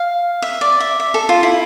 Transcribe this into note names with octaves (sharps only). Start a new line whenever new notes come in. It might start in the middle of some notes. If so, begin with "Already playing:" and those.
Already playing: F5
E5
D5
E5
E5
A4
F4
E4